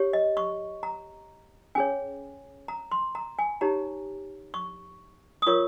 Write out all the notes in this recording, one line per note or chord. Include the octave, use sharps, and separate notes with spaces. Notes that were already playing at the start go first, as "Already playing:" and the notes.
Already playing: G4 C#5
D#5
C#6
A#5
C#4 G#4 C#5 G#5
A#5
C6
A#5
G#5
D#4 G4 C#5 A#5
C#6
D#6
F4 A#4 C#5 C#6